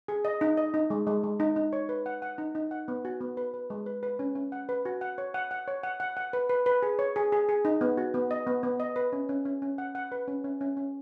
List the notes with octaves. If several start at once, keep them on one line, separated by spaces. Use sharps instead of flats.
G#4
D#5
D#4
D#5
D#4
G#3
G#3
G#3
D#4
D#4
C#5
B4
F#5
F#5
D#4
D#4
F#5
B3
F#4
B3
B4
B4
G#3
B4
B4
C#4
C#4
F#5
B4
F#4
F#5
C#5
F#5
F#5
C#5
F#5
F#5
F#5
B4
B4
B4
G#4
C#5
G#4
G#4
G#4
D#4
B3
F#4
B3
D#5
B3
B3
D#5
B4
C#4
C#4
C#4
C#4
F#5
F#5
B4
C#4
C#4
C#4
C#4